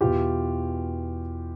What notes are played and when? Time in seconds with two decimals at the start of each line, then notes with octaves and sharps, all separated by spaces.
0.01 E2 B2 F4 G4